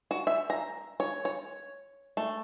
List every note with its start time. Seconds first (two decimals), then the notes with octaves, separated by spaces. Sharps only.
0.11 F#4
0.27 E5
0.50 A#5
1.00 C#5
1.25 C#5
2.17 A3